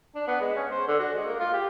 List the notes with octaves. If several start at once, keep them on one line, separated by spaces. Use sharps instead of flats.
D4
B3
G#3
C#4
C5
D3
F#4
G#3
A#3
F4
G4